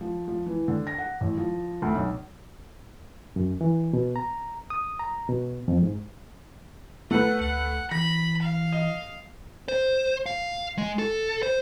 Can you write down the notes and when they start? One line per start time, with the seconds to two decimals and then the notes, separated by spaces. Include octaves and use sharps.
0.01 F3
0.28 F3
0.46 E3
0.68 D3
0.87 A#6
0.98 F#5
1.21 A1
1.37 F3
1.82 D2
1.95 B1
3.36 F#2
3.61 E3
3.93 B2
4.16 A#5
4.70 D#6
4.99 A#5
5.29 B2
5.68 F2
5.82 G#2
7.11 A3 B4 F#5
7.41 D2 F#5
7.91 E3 B5 A#6
8.42 F5
8.72 D#5
9.68 C5
10.26 F5
10.78 G#3
10.99 A4
11.43 C5